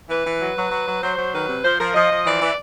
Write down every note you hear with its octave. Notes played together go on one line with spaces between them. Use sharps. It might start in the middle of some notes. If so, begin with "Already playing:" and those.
E3 B4
E3
F#3
F#3
F#3
F#3
F#3 C5
F#3
D#3 B4
C3
F3 C5
F3 A#4
F3 D#5
F3
E3 D5
E3